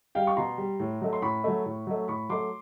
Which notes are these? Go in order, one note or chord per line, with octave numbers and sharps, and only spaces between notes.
G3 F5 G5
C#6
B2 A#5 C6
G3
A2
F#3 A3
C6
A2 B5 C#6
F#3 A3
A2
F#3 A3
A2 B5 C#6
F#3 A3 C6 D6